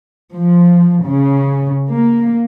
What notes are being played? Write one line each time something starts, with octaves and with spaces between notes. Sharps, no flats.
F3
C#3
A#3